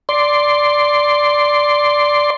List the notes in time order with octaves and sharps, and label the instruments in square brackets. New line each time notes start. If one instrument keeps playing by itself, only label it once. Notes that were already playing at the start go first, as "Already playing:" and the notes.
[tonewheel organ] D5 C6